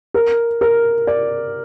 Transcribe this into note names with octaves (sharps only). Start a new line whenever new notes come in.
A#4
A#4
D5